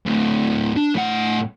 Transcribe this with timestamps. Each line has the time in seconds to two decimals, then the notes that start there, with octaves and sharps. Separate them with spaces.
0.06 D2 A2
0.76 D4
0.95 A2 F#5